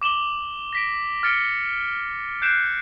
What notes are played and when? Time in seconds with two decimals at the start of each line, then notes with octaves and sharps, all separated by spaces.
0.01 D6 E7 F#7 G7
0.73 A#6 B6 D7
1.23 F6 A6 C#7 D7 G7
2.42 F#6 G6 C7 D7 E7